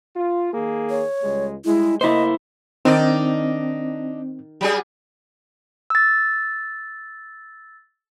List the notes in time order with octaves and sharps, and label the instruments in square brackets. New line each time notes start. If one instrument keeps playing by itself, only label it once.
[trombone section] F4
D#3 A#3 G#4
[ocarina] C#5
[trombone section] C#2 G3 G#3
[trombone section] G3 G#3 [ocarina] E4
[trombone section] A3 A#3 [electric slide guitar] E4 C5 [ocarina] D#5
[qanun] D#3 [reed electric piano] C4 [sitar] D4 D#4 D5
[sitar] F#3 G3 G#4
[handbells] E6 A6